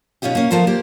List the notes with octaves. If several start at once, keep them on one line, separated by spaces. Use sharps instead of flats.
B2 C#4 D#4 F4 G4
A#3 C#4
F3 A3 F4 A#4 C5
A#3 G4 C5 D5